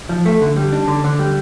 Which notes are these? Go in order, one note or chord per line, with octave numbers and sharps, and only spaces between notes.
F3
A3
D3
G3
D4
D3
D3
G3